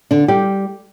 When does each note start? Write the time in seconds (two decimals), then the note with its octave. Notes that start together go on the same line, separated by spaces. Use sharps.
0.11 D3 D4
0.28 G3 G4